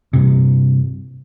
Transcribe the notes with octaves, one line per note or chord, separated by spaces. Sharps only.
G2 C3